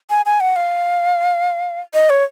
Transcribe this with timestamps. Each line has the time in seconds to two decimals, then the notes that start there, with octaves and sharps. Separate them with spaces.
0.10 G#5
0.26 G#5
0.40 F#5
0.56 F5
1.94 D#5
2.10 C#5